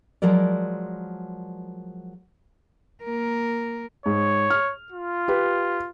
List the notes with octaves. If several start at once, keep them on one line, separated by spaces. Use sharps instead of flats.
F3 F#3 G#3 A#4 D5
A#3 A#4
G#2 C#5
F6
F4
G4 B4